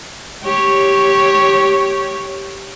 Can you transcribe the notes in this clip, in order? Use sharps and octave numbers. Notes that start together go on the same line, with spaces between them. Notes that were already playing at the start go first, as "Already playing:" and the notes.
G4 C#5